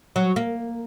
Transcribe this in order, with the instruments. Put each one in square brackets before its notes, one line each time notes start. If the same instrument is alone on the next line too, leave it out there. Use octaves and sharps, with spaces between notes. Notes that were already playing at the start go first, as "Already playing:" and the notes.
[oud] F#3
A#3